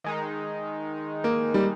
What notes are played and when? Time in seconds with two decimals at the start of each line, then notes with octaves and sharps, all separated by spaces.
0.04 D#3 G#3 D#4
1.24 A#3
1.54 G3